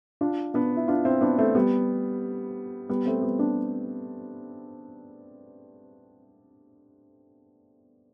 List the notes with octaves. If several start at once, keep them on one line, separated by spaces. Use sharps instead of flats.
D4 F4
B3 D4
E4
D4 F4
C4 E4
B3 D4
A3 C4
G3 B3
G3 B3
A3 C4
G3 B3
B3 D4